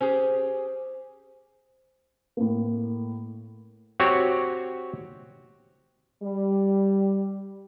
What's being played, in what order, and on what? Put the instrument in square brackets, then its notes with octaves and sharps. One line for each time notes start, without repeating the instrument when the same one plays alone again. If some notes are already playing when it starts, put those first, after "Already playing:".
[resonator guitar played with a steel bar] C#4 G4 G#4 [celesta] C5
[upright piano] A2 A#3
[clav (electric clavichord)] C4 F#4 G4 C#5
[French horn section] G3